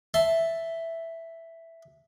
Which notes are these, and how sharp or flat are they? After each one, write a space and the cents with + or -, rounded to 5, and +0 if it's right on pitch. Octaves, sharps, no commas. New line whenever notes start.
E5 +0 A5 +0 C6 +0